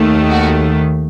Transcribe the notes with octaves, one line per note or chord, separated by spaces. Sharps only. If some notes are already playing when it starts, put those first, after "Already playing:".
Already playing: D#2 D#3 A3
F#4